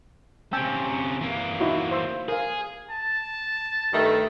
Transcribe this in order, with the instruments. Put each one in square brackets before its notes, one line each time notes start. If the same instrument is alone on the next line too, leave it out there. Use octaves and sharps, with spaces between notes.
[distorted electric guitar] C3 C#4 [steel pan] G5 A5 E6
[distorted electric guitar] E3 A#3
[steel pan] D#4 E4 F#4
C5 C6 E6
[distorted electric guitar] G#4 [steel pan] A#4 F5
[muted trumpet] A5
[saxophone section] G2 D#3 A3